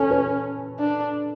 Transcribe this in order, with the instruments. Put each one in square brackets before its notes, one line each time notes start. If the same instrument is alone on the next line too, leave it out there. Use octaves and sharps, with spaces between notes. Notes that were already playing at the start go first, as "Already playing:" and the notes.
Already playing: [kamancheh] C#4 [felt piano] A4
[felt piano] B4
[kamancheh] D4